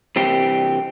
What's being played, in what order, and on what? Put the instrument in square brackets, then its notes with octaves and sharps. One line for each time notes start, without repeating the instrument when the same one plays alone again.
[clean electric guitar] C2 E3 C4 G4